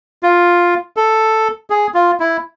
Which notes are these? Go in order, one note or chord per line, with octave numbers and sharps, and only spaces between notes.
F4
A4
G#4
F4
E4